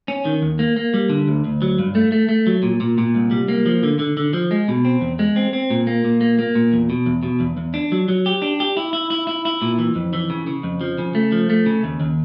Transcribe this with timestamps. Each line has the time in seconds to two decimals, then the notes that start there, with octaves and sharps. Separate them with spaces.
0.08 C#4
0.25 D#3
0.42 D#2
0.59 A#3
0.76 A#3
0.94 G3
1.09 D3
1.28 D2
1.44 D2
1.62 F#3
1.79 G2
1.95 A3
2.12 A3
2.29 A3
2.47 F#3
2.63 A#2
2.80 A#2
2.98 A#2
3.15 C2
3.31 G3
3.48 A#3
3.66 F3
3.83 D3
3.99 D3
4.17 D3
4.33 F3
4.51 G#3
4.68 B2
4.85 C4
5.01 E2
5.19 G#3
5.36 C4
5.53 C4
5.70 A#2
5.87 A#3
6.05 A#2
6.21 A#3
6.39 A#3
6.55 A#2
6.73 E2
6.90 B2
7.06 E2
7.23 B2
7.40 E2
7.57 E2
7.74 D4
7.92 F#3
8.08 F#3
8.26 G4
8.42 D4
8.60 G4
8.77 E4
8.93 E4
9.10 E4
9.27 E4
9.45 E4
9.62 A#2
9.79 E3
9.95 F2
10.13 E3
10.30 C#3
10.47 C#3
10.63 F2
10.81 F3
10.98 C#3
11.15 A3
11.32 F3
11.50 A3
11.66 C#3
11.84 D#2
12.00 D#2